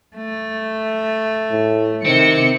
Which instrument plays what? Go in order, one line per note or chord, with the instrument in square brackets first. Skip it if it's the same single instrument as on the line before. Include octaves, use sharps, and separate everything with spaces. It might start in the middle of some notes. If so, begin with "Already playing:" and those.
[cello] A3
[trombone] A2
[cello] C3 [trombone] D#3 [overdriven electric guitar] C4 [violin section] C#7